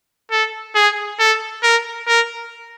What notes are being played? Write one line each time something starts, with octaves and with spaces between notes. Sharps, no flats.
A4
G#4
A4
A#4
A#4